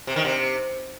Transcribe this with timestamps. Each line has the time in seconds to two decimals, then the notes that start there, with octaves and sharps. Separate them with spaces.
0.07 C3
0.16 D#3
0.25 C3